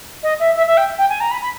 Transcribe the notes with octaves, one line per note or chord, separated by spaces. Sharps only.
D#5
E5
E5
E5
G5
G5
G#5
A#5
B5
B5